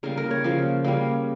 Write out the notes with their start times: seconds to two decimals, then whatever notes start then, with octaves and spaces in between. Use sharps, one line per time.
0.03 C#3 G3 A#3 A#4
0.17 A#4
0.31 C#5
0.44 C#3 F3 A#3
0.84 C#3 G3 A#3